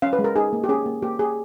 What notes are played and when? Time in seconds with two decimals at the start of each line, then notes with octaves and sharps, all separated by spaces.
0.02 C#4 F5
0.13 B4
0.19 G#3
0.24 A#4
0.36 D#4 G#4
0.53 A#3
0.64 G4
0.69 C#4 G#4
0.86 A#3
1.02 A#3 G4
1.19 G4 G#4